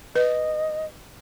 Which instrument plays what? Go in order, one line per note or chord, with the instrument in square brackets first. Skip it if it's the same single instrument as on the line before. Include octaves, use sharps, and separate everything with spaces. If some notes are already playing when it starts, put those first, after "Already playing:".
[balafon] B4 [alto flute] D#5